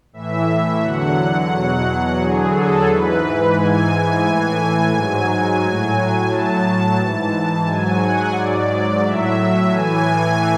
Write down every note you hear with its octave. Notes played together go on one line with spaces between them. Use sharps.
A2 E3 E5
E2 D3 F#3 F#5
E2 B2 F#3
E2 D3 F#3 G#4
A4
G#2 E3 B4
G#2 E3 G#5
A2 E3
G#2 F#3
A2 F#3
A2 F#3 A5
G#2 E3 A5
G#2 F#3 G#5
F#5
G#2 F#3 D5
A2 F#3 E5
A2 E3 G#5